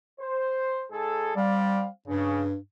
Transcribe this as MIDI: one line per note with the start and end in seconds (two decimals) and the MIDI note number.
0.20 0.82 72
0.91 1.33 44
0.91 1.33 68
0.91 1.33 69
1.36 1.87 55
1.36 1.83 60
1.36 1.83 74
1.36 1.83 77
2.08 2.56 43
2.08 2.45 49